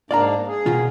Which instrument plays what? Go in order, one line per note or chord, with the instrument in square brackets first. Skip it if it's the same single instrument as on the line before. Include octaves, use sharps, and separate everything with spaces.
[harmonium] G#2 A#3 D4 [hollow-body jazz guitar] D5 F5 A#5
[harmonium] G#4
[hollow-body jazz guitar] B2 D#3 F4